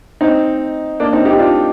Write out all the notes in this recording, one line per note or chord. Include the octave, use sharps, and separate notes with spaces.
C4 D#4
A#3 D4
C4 D#4
D#4 G4
D4 F4